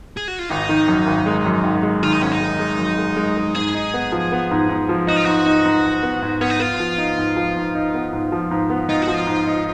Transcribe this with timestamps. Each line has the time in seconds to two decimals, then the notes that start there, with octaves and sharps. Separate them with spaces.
0.17 G#4
0.28 F#4
0.39 F4
0.49 G#1 D#4
0.69 D#3
0.88 F#2
1.07 G#1
1.26 G#3
1.45 F#2
1.64 G#1
1.83 G#3
2.03 D#3 F4
2.13 D#4
2.22 G#1 C#4
2.32 D#4
2.41 G#3
2.60 G#3
2.79 F#2
2.98 G#3
3.17 G#3
3.37 G#3
3.55 G#2 G#4
3.74 D#4
3.94 B3
4.12 F3
4.32 B3
4.51 G#2
4.69 G#2
4.89 F3
5.07 D#4 F#4
5.16 F4
5.24 G#2 F#4
5.46 D#4
5.65 G#2
5.85 G#2
6.03 B3
6.22 G#2
6.41 B3 C#4
6.50 D#4
6.60 B3 F4
6.80 F3
6.98 D#4
7.18 G#2
7.37 F3
7.56 G#2
7.75 D#4
7.94 B3
8.13 G#2
8.32 F3
8.51 G#2
8.70 B3
8.89 D#4 F4
9.02 F#4
9.08 F3
9.14 F4
9.27 G#2
9.47 D#4